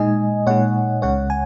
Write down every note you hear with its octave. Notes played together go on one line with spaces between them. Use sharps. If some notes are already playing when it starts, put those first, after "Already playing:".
Already playing: A#2 G#3 D#4 D#5 G#5
A#2 G#3 D#4 C#5 F#5
C#2 C#3 G#3 C#5 F#5
G#5